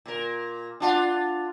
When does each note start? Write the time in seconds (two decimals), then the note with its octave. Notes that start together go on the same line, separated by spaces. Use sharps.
0.06 A#2 A#4
0.80 D4 F4 F#5 A5 D#6